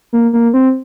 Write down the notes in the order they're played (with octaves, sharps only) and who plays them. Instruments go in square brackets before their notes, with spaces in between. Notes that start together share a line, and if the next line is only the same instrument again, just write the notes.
[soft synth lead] A#3
A#3
C4